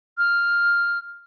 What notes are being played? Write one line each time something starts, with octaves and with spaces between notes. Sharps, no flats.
F6